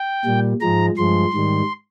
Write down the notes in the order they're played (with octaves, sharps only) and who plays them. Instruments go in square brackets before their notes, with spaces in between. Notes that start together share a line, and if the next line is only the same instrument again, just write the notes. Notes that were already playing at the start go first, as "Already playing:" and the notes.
Already playing: [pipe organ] G5
A#2 G3
G#2 F3 G#3 A#5
G2 F3 G#3 C6
G#2 D#3 G3